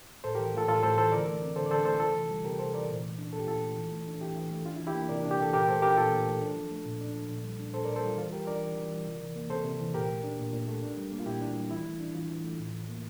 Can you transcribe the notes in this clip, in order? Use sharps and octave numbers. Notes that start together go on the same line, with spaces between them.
A2 A4 C5
E3 G4 A#4
A3 F4 A4
A2 F4 A4
A2 A4 C5
E3 A4 C5
D3 A#4 D5
A3
C4
D3 A4 C5
D5
D3 A4 C5
A3 A4 C5
C3 F4 A4
E3
G3
C3 G4 A#4
C3 A4 C5
E3 A#4 D5
A#2
A3
D4
A#2 A4
G4
A#2 F4 A4
A3
E3
A3
D4
E3 E4 G4
E3
A3
D4 F4
E4
E3
E4 G4
A#3
C3 A#4 D5
D4
G4
E3 A4
A#2 G4 A#4
A3 A4 C5
D4 G4 A#4
A#2 F4 A4
A#2
A3
D4
F3
A3
A#2
D4
F3
A#2
G3
D4
A#2 A4 C5
A#2 A#4 D5
A4 C5
G3 F4
E3 F4
G3 G4 A#4
D4 A#4 D5
E3
E3
G3
C3
E3
A#3
C3 A4 C5
C3
E3
A#2 G4 A#4
A3
D4
A#2
A#2
A3
D4
G3
A#3
F4
A#2 E4 G4
D4
G3
E3 E4
A3
D4
E3 F4
E3
A3
A2
E3
A#3